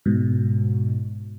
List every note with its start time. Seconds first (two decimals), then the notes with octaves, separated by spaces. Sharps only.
0.06 G#2 B2